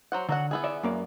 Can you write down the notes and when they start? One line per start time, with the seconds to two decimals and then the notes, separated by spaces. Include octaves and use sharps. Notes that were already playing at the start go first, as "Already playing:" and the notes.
0.12 F#3 C5 F#5
0.29 D3 F#3 F#4 F#5
0.51 B3 E4 G#4
0.64 D5 E5
0.83 F#2 A#3 D5